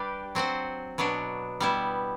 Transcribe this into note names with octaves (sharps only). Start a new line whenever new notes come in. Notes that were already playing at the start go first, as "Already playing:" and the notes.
Already playing: G3 D4 G4 B4 D5
F#3 C4 F#4 C5
B2 F#3 B3 D4
G3 B3 E4